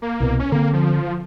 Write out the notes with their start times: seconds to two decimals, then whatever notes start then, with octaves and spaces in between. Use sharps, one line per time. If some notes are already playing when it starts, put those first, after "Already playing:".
0.02 A#3
0.20 C2 B2
0.40 C#4
0.52 D3 A#3 C4
0.73 F3